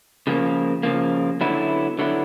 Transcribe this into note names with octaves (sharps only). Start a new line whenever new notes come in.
C#3 F3 A#3
C#3 F3 A#3
D3 F#3 B3 E4
D3 F#3 B3 E4